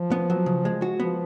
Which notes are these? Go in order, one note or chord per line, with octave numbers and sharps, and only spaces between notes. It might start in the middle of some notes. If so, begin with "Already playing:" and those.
Already playing: F3
B3
F#3
C#3
G#3
F#4
F3 B3